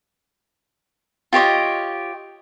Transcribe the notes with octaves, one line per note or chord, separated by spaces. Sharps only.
F4 G4 C#5 D#5